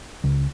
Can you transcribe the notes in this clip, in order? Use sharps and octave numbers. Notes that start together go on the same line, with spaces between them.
C#2